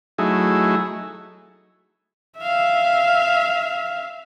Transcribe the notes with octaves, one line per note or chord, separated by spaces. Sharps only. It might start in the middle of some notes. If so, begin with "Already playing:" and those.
F#3 A3 D#4 E4 G#4
E5 F5